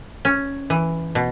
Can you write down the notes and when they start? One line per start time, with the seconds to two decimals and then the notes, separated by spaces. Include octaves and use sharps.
0.25 C#4
0.70 E3
1.15 B2